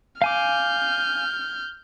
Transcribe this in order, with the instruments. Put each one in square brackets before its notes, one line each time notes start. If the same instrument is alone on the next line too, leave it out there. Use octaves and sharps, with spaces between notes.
[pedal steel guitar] F5 G#5 D6 [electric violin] F6 G6